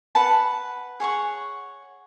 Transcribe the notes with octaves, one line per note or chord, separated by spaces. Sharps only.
B4 F#5 A5
G#4 C#5 F#5 C#6